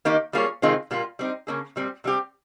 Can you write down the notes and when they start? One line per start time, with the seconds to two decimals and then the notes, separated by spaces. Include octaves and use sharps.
0.05 D#3 A#3 D#4 G4
0.33 G3 A#3 F4 G#4 C#5
0.62 C3 D#3 G#3 C4 F4
0.91 A#2 G3 A#3 F4
1.19 G3 C4 D#4
1.47 C#3 F3 A#3 C#4 G#4
1.76 A#2 G3 C4
2.04 C3 G3 C4 G4